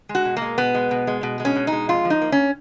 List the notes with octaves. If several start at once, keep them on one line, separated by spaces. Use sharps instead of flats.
G#3
F#4
B2
G#3 A#3
B2 B3
G#3
B2
G#3
B2
G#3
C#4
B2
D#4
G#3
F2 F4
F3
D#4
A#3
C#4